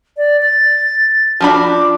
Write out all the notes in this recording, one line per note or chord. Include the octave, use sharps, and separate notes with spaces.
D5
A6
F3 D4 F#4 B5
D6